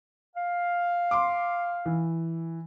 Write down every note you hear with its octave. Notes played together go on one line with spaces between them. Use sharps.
F5
C6 D6
E3